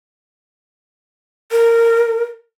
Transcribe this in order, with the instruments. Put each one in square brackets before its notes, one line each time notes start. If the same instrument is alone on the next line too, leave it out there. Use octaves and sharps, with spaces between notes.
[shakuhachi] A#4